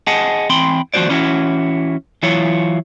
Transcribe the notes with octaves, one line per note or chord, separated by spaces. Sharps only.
G#4 D#5 F#5 G#5 A5
E3 C4 G5 B5 C6
D#2 F3 G3 F#4 C5 D5
E3 C#4 E4 F#4
E3 F#3 E4 F4 C#5